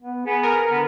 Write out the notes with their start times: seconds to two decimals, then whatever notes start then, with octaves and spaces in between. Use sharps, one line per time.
0.01 B3
0.26 B3 G#4
0.43 A#4
0.70 D3 B3